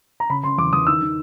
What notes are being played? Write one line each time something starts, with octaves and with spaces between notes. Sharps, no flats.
A#5
C#3 B5
C#3 C6
E2 D6
E2 D#6
D#3 E6
D#3